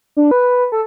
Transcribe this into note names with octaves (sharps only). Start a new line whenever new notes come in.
D4
B4
A4